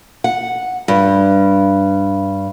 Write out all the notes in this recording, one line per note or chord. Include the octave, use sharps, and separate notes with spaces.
F#5
G2